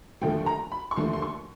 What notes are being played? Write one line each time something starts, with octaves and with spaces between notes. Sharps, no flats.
D#2 D3 F3 A3 G5
A#5
B5
C#6
D#2 D3 F3 A3 C6
C6
C#6